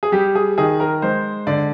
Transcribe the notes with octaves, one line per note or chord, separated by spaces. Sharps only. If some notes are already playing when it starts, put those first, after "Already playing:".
G#4
G3 G4
G#4
D#3 G#4
A#4
G#3 C5
D3 D5